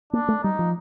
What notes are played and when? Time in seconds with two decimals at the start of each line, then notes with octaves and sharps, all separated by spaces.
0.13 A#3 D4
0.28 A3
0.43 G3 D#4
0.59 F3